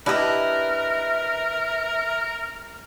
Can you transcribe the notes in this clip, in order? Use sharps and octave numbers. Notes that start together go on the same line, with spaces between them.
D4 E4 G4 A#4 B4 D#5 E5